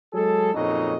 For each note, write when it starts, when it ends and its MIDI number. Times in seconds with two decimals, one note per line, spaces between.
0.14 0.53 54
0.14 0.53 56
0.14 0.53 68
0.14 0.53 69
0.54 0.97 41
0.54 0.97 46
0.54 0.97 49
0.54 0.97 54
0.54 0.97 63
0.54 0.97 75